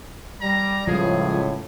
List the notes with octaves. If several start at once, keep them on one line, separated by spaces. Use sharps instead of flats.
G3 A#5
C#2 A2 F3 G3 G#4